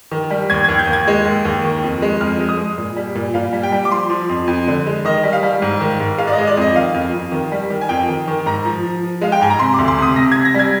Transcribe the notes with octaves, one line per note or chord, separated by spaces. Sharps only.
D#3
G3
D#2 G#6
D#2 G#6
G6
D#2
G#6
G#3
D#2
D#2
D#3
F2
G#3
F2 F6
G#3
D#6
G#3
A#2
G3
A#2
A#2 F5
G3
G5
G3
D6
F3 C6
F3
F2
F2
D3
G#3
D#3 D#5
G3
F5
G3
G#2
D#3
G#2
G#3 F5
D5
D#5
G#3
D5
F2 D#5
D#3 F5
F2
F2
D#3
G3
D#3
G#5
F2 G5
D#3
D#3
G#2 A#5
F3
F3
F3
G#3 F5
G5
G#2 G#5
A#5
C3 C6
D2 D6
C6
C3 D#6
C3 A#6
C3 G#6
A#6
G3 G#6